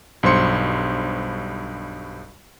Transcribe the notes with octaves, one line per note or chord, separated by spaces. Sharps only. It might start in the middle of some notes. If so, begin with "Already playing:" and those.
B1 G2 C5 C6 C#7